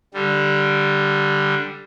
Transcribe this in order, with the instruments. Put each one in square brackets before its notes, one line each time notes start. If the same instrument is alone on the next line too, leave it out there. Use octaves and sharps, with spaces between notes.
[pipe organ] D3 G3